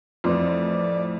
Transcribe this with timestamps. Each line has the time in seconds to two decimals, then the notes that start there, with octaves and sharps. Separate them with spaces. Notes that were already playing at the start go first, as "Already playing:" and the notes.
0.24 F2 A2 E3 F3 C4 F4 D5